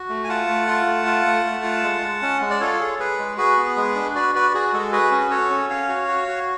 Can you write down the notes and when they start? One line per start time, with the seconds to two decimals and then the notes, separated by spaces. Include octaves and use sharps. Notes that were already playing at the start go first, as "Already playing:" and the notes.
Already playing: F#4
0.09 A3
0.24 G#5
0.28 F4 F#5 A5
0.48 A3
0.68 F4
0.86 A3
1.06 F4
1.26 A3
1.45 A3
1.63 F4
1.83 G#3
2.02 G#3
2.22 C#4
2.41 G#3
2.50 D5
2.60 F4 A4 C#5
2.80 G#4
2.99 G#4 B4
3.19 G#3
3.37 F#4 G#4 B4
3.57 B3
3.77 G#3
3.95 D4
4.15 F#4 B4 D5
4.35 F#4 B4 D5
4.54 F#4 G#4
4.73 G#3 A4
4.92 F#4 G#4 B4
5.11 C#4
5.31 F#4 A4 C#5
5.50 C#4
5.70 C#4 C#5 F5
5.89 F#4
6.08 F#4
6.28 F#4